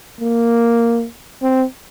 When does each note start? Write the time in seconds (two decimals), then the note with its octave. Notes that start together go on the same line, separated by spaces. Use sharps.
0.21 A#3
1.43 C4